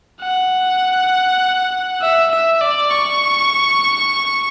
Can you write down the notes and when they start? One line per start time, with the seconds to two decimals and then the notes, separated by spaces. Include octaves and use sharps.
0.21 F#5
2.01 E5
2.31 E5
2.62 D5
2.92 C#6